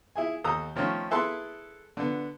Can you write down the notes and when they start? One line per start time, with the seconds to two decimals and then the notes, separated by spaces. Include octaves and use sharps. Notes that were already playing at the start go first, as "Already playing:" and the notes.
0.16 E4 G#4 G#5
0.44 D#2 A4 A#5 D#6
0.76 D#3 F3 A3 C#4
1.11 E4 G#4 A4 B4 A5 C6
1.97 D3 B3